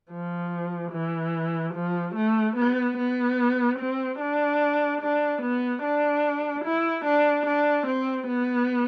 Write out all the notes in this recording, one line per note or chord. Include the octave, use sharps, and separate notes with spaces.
F3
E3
F3
A3
B3
B3
C4
D4
D4
B3
D4
E4
D4
D4
C4
B3